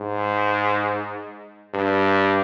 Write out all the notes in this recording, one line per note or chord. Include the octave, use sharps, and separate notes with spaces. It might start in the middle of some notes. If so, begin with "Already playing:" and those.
Already playing: G#2
G2